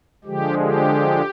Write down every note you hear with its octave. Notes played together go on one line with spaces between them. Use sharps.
D3 F3 G#3 G4
G4